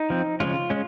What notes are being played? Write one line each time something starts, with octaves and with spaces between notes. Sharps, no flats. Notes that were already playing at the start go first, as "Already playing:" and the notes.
Already playing: D#4
F3 C4
C#3 F3 G#3 C#4 F4
G#3 C#4